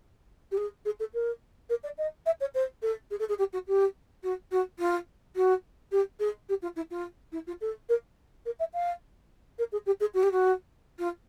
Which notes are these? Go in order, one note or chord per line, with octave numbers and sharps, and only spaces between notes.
G4
G#4
G#4
A4
A#4
A#4
D5
D#5
E5
C#5
C5
A4
G#4
A4
G#4
G4
F#4
G4
F#4
F#4
F4
F#4
G4
G#4
G4
F4
E4
F4
E4
F4
A4
A#4
A#4
E5
F5
A#4
G#4
G4
G#4
F#4
G4
F#4
F4